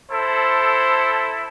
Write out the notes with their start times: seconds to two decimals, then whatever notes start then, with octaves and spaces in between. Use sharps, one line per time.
0.11 E4 A4 C5